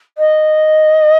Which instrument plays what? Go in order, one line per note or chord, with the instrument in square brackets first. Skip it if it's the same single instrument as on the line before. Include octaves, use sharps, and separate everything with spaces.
[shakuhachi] D#5